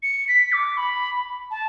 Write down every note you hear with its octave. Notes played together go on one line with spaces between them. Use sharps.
C#7
B6
D6
B5
A5